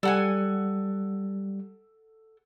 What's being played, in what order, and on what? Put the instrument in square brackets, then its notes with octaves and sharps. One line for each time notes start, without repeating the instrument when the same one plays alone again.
[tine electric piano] G3 [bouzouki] A4 F#5 G#5